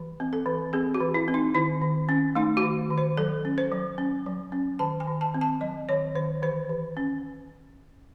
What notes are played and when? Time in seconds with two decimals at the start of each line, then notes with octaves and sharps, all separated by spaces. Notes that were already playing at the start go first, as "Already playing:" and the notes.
Already playing: E3
0.20 C4
0.33 A4
0.46 E3
0.73 C4 G#4
0.94 F#4
1.00 E3
1.14 E4
1.28 C4
1.34 D#4
1.54 D#3 E4
1.82 D#3
2.09 C#4
2.35 A3 D#4
2.57 F#4
2.63 D#3
2.90 D#3
2.98 C5
3.17 F#3 A4
3.45 C#4
3.58 C5
3.72 F#3
3.98 C#4
4.26 F#3
4.52 C#4
4.79 D#3 A5
5.00 G#5
5.07 D#3
5.21 A5
5.34 C4
5.41 A5
5.61 F#3 D#5
5.89 D#3 C#5
6.15 D#3 C5
6.42 E3 C5
6.69 E3
6.97 C#4